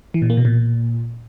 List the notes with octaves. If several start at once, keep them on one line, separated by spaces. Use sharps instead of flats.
E3
A#2
A#3
B2
A#2